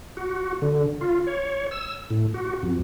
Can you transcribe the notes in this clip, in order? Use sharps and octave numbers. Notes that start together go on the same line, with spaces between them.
F#4
D3
F4
C#5
E6
A2
F#4
F2